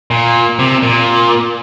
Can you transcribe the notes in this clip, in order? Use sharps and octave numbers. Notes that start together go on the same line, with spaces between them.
A#2
C3
A#2